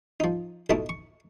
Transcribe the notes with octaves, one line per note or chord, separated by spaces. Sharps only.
F3 D#4
B1 B2 A3 D#4 E4 A5
C#6